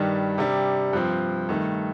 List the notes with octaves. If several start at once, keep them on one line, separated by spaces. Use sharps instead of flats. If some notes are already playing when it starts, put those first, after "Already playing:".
Already playing: G2 D#3 G3 D4
C3 G3 D4
G2 F3 C4
G2 D#3 A3